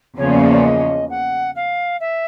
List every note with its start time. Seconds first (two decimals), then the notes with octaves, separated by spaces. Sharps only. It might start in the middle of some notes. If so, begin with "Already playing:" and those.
0.18 E2 C#3 F3 A#3 C#4 C#5
0.30 D5
0.41 D5
0.52 D5
0.64 D#5
1.09 F#5
1.55 F5
2.00 E5